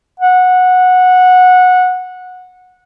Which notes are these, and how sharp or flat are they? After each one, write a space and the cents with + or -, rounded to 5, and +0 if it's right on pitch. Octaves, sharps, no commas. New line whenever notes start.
F#5 -15